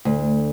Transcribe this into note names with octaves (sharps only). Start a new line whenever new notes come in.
D2